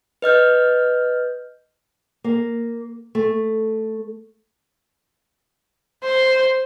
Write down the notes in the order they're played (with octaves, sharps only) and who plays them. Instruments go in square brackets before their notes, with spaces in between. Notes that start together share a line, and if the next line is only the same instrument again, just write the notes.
[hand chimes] B4 D#5 F6 G6
[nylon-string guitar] A#3
A3
[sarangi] C5